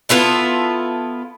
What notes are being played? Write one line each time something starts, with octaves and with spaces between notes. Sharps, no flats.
B3 E4 F4 A4